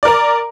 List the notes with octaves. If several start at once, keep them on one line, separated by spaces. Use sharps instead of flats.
A#4 D5 A#5